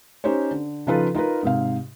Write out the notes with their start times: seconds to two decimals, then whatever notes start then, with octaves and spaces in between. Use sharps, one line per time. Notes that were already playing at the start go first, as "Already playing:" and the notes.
0.24 C#4 D#4 G4 C5 C#5
0.51 D3
0.87 C#3 F3 D#4 F4 A4 B4
1.14 D#4 F4 A#4 B4
1.43 G#2 C3 F5